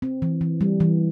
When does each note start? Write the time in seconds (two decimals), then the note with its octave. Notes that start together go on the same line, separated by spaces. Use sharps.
0.02 C4
0.22 E3
0.41 E3
0.61 G3
0.80 E3